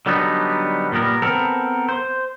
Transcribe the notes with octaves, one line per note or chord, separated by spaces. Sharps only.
D3 F#3 G3 B3 D4 D#4
A#2 G3 B3 A#4
B3 C4 A4 A#4
C5